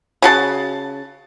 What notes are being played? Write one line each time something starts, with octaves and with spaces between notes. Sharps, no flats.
C#3 F#4 A5